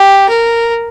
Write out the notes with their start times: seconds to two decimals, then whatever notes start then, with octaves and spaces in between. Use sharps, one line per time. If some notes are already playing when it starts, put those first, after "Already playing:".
Already playing: G4
0.29 A#4